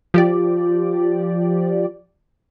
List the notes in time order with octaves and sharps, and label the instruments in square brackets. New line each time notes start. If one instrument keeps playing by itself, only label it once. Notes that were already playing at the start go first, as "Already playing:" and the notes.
[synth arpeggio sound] F3 G4 D5